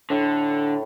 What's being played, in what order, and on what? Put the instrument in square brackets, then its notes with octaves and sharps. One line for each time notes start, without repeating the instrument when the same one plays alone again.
[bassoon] A2 [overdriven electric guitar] D3